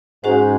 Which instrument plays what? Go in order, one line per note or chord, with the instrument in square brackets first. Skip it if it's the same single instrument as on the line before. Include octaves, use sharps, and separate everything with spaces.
[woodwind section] G#2 [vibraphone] C#4 F#4 C5 F#5